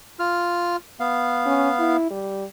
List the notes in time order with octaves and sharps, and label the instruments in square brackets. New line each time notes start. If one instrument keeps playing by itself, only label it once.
[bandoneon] F4 F6
B3 F5
[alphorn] C#4
E4
G3